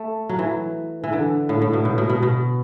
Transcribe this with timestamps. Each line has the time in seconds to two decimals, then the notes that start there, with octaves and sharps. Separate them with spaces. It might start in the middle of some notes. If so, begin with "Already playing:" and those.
Already playing: A3
0.29 F#3
0.39 E3
1.04 E3
1.13 D3
1.49 A2
1.62 A2
1.73 B2
1.85 A2
1.98 B2
2.10 B2
2.23 B2